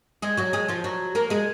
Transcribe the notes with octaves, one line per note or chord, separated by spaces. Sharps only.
G#3 G#4
F#3 F#4
G#3 G#4
F3 F4
F#3 F#4
A#3 A#4
G#3 G#4